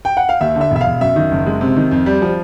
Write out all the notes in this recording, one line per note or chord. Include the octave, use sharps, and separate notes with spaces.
G5
F#5
F5
D#2 E5
D3
E5
E1
E5
F5
E1
F#2 E5
D#3
F#1
G#3
C3
D#3
F2
G3
F3